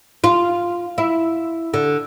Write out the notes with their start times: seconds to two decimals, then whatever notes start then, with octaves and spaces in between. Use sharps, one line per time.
0.24 F4
0.98 E4
1.74 D3